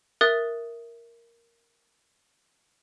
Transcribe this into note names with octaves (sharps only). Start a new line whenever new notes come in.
A#4 E5 D#6 F#6 A6